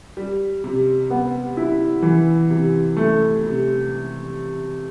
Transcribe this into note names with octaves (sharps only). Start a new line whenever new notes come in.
G3
C3
B3
E4
E3
C3
A3
C3